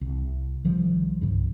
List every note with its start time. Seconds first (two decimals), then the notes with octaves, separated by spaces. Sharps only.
0.01 C2
0.64 B1 D#3 F3 G3
1.21 C2 G2 C#3